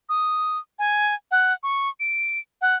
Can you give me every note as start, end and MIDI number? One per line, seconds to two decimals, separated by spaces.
0.09 0.58 87
0.79 1.14 80
1.31 1.53 78
1.63 1.89 85
2.00 2.39 98
2.61 2.75 78